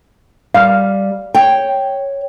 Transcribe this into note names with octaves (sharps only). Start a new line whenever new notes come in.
G3 F5
C#5 G5